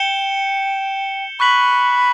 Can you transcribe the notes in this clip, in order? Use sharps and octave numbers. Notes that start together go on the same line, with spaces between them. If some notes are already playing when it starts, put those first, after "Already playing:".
Already playing: G5 G6 C#7 E7 G7
B5 C#6 F#6 B6 F#7